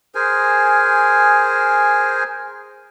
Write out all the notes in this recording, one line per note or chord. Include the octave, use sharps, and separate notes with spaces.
G#4 A#4 C5 G#5